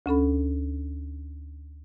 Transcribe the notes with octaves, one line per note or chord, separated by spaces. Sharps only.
D2 C#4 A4 B5